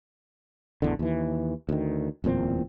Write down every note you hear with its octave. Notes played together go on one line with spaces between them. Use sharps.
A1 E2 D3
D#2 E3
D2 D#3
D1 E2 A#2 C4